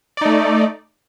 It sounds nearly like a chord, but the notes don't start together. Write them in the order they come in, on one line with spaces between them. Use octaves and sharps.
D5 D#4 A3